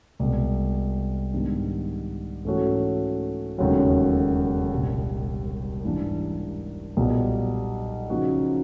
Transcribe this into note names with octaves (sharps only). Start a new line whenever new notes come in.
C2 B2 G#3
G#2 D#3 G3 B3 D4
G#2 E3 A3 C#4 F#4
E1 D#2 C#3 F#3 A3
C2 A#2 G3
G#2 E3 G3 A#3 D4
B1 A#2 G3 B3
C#3 F3 A#3 D#4 F#4